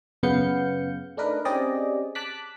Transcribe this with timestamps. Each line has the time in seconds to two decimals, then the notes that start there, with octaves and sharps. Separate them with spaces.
0.23 F#2 C#3 B3 F5 G6 C#7
1.17 A3 D4 D#4 A#4 B4
1.45 C4 C#4 G4 G#4 D5 D#5
2.15 A5 D6 F#6 B6